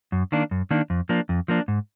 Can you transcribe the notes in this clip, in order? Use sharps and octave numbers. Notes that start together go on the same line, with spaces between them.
F#2
D#3 A#3 D4
F#2
D#3 A#3 D4
F2
F3 A#3 D4
F2
F3 A#3 D4
G#2